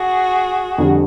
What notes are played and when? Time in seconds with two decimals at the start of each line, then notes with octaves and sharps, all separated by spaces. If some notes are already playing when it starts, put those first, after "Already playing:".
Already playing: F#4 G#4
0.78 F2 D3 G3